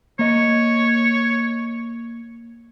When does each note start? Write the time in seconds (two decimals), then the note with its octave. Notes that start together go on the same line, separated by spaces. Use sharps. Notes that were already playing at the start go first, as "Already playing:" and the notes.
0.19 A#3 C#5 D#5